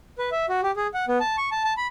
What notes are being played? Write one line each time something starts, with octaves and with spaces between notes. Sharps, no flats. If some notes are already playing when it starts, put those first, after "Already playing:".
B4
E5
F#4
G4
G#4
F#5
B3
A5
C#6
A5
A5
B5